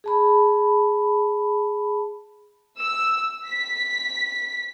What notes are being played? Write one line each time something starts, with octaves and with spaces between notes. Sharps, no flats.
G#4 A5 B5
E6
B6